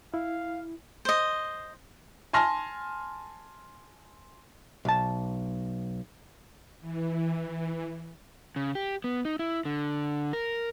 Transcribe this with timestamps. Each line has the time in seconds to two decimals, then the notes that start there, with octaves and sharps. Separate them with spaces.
0.14 E4 F5
1.05 C5 D#5
2.33 G#5 A5 C6 F6 A#6
4.85 B1 A5
6.81 E3
8.56 C#3
8.75 G4
9.04 B3
9.25 D#4
9.39 E4
9.65 D3
10.33 A#4